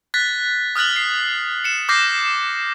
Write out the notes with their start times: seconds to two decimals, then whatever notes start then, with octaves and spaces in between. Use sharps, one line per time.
0.14 F#6 A6 B6
0.76 D#6 F6 F#6 A6 F#7
0.96 C7
1.64 C#7 E7
1.89 D6 F6 G6 A#6 C7